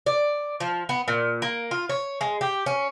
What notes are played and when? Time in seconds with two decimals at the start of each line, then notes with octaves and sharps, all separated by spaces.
0.06 D5
0.60 F3
0.89 B3
1.08 A#2
1.42 A#3
1.71 F4
1.89 C#5
2.21 G#3
2.41 G4
2.66 C#4